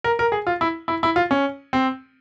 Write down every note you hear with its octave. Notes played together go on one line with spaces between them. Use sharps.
A#4
A#4
G#4
F4
E4
E4
E4
F4
C#4
C4